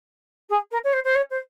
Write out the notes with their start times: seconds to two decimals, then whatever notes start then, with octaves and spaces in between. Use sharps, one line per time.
0.49 G#4
0.71 A#4
0.84 C#5
0.93 C5
1.04 C5
1.15 C#5
1.30 C5